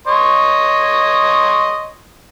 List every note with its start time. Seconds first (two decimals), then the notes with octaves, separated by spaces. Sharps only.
0.07 C#5 D#5 C6